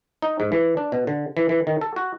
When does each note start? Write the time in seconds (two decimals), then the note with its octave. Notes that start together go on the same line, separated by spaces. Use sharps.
0.22 D#4
0.40 G#2
0.52 E3
0.77 D4
0.92 B2
1.07 D3
1.37 E3
1.49 E3
1.67 D#3
1.81 A4
1.96 F#4